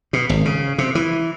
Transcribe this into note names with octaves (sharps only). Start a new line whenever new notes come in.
B2
G#1
C#3
C3
E3